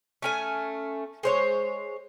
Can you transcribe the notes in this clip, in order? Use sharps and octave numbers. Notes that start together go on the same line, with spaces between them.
A3 C#4 G#5
G#3 C5 C#5